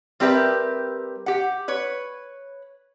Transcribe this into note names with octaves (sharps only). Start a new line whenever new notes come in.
G3 C4 G4 A#4 B4 E5
G4 F#5
B4 C#5